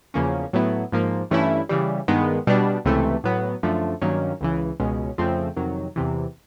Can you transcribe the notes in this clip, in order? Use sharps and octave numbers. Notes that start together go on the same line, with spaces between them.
E2 C#3 F3 A#3 C#4
A2 F#3 B3 E4
G#2 F3 A#3
G2 E3 A3 C#4 E4
C#3 E3 G3
G2 D#3 G#3 B3
B2 G3 B3 D4
C#2 C3 E3 A3
A2 F#3 B3
F#2 D3 F3 A3
G2 D#3 F#3 A#3 C#4
C#2 C#3 E3
C#2 B2 G#3 C#4
F2 C#3 F3 A3 C4
F2 C3 D#3 F#3
E2 C3 E3